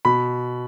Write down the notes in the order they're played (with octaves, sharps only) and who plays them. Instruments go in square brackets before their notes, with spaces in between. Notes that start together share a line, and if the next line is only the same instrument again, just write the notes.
[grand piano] B2 B5